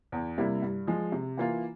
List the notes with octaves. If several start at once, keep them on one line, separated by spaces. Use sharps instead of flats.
E2
C3 G3 A#3 E4
G2
F3 G#3
C3
E3 A#3 F4